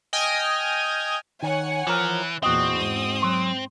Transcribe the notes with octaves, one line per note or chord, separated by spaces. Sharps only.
D#5 G5 G#5 D#6 F6
D#3 C#5 F#5 G#5
E3 F3 A#4
E2 A#2 C4 F#4 D#5
G#2 D#6
F#3 C6